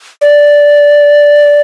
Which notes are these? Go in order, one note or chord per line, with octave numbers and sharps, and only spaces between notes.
D5